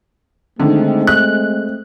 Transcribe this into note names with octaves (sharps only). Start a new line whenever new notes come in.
D3 D#3 G#3 A3 C4
F#6